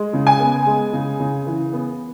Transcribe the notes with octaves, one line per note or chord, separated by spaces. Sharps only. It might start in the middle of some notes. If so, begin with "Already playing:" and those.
Already playing: G#3
C#3
G#5
B3
G#3
C#3
C#3
E3
B3